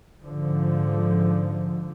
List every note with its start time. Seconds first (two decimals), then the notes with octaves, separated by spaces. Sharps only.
0.23 G#2 D3 F3